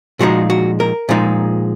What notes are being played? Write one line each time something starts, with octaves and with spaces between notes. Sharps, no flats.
A#2 F3 G#3 D#4 F#4
F#4
A#4
A#2 F3 G#3 D#4